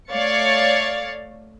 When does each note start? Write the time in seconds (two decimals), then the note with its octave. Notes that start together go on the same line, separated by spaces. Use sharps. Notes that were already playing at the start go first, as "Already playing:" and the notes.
0.11 A3 C#5 D5 F5 A6 C#7